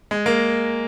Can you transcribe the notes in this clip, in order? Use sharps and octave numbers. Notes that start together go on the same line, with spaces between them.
G#3
A#3